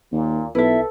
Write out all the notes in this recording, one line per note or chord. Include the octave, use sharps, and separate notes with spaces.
D#2 A#2
B1 E4 A4 B4 E5